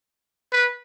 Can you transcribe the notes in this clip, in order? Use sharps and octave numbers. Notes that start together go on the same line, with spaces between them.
B4